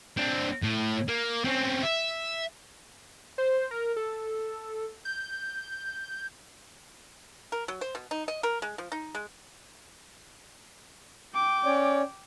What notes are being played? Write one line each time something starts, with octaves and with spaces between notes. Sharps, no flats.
C4 D4
A2
A#3
C4 C#4
E5
C5
A#4
A4
G6
A#4
F#3
C5
B2
D#4
D#5
A#4
G#3
F3
D#4
G#3
G5 D6
C#4 C#5 D5